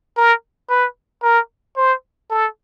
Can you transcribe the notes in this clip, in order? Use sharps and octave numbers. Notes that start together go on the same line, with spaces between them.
A#4
B4
A#4
C5
A4